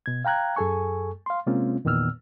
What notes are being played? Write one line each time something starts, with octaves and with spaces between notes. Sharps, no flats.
B2 G#6
F5 G5 A#5 F#6 G#6
F#2 G#4 A4 G#5 C#6
F5 C6
C3 G#3 A#3 C4 C#4 F4
E2 A#2 D#3 B3 E6 F6